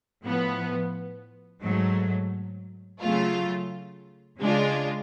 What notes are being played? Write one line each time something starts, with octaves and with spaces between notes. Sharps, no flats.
A2 F3 B3
G#2 F#3 A3
C#3 F#3 A3 F4
C#3 G#3 D4 F4